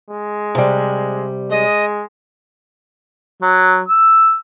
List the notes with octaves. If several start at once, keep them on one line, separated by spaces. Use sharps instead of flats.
G#3
C3 G3
G#3 D#5
F#3
E6